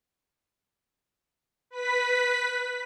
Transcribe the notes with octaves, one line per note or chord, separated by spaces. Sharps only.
B4 B6